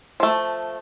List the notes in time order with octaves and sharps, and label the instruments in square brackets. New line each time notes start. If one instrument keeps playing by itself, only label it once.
[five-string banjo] F3 A3